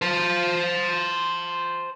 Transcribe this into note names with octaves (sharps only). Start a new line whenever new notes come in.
C5 A5